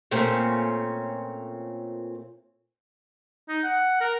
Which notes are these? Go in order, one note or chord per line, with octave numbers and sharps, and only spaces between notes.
A#2 A3 C4 C#4
D#4
F#5
A#4